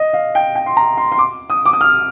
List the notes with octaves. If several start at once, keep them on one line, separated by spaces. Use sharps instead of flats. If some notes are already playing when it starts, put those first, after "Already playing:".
Already playing: D#5
F5
G5
G5
C6
A#5
C6
C6
D6
D#6
D6
D#6
F6